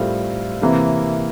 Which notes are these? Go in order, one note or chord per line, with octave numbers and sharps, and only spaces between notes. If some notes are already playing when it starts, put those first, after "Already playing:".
Already playing: A2 G3 C4 F4 A#4
C3 E3 A#3